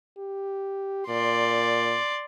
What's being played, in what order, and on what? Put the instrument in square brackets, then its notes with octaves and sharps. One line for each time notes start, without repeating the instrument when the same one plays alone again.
[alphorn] G4
[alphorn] A#2 [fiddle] D5 C6